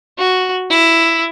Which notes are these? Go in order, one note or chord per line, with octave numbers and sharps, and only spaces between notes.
F#4
E4